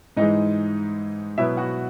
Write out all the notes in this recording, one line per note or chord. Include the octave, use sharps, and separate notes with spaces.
G#2 E3 G#3 D#4 D#5
B2 F#3 B3 E4 E5
F#4 F#5